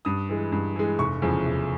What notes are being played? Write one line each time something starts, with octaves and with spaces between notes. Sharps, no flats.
G2 D#6
E3 G#3
G2
E3 G#3
F1 C#6
E2 C#3 F3
F1